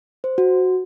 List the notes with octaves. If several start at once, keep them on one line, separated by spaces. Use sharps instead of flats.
C5
F#4